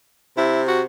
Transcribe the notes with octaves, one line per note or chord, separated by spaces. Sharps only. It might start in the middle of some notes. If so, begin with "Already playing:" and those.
C3 E4
F#4